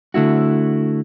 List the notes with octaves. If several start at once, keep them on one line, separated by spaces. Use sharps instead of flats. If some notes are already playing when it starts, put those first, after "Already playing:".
D3 A3 E4 F#4